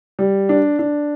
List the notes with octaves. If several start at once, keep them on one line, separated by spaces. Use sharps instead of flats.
G3
D4
D4